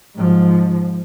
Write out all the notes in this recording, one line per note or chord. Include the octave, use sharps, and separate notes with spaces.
G#2 F3